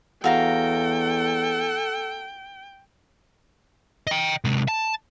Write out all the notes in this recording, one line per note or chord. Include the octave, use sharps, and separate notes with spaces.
E2 F#4 A4 F5 G5 A#5
D#5 G5
C3 G#3
A5